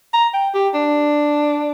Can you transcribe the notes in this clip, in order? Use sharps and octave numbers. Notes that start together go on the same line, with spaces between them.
A#5
G5
G4
D4